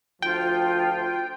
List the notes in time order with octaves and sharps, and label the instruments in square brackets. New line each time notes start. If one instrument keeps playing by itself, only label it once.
[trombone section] D2 F3 [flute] F4 [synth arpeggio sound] G5